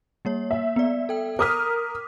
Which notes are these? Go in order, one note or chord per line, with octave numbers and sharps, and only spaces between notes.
G3 A#3 C#5
E5
B3 D5
A4 G5
A#4 D6 D#6 F6 B6